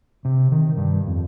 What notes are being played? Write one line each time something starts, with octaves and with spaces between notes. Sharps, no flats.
C3
D#3
G2
F2